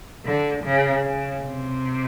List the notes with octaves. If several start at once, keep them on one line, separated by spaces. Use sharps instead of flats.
D3
C#3
C#3
C3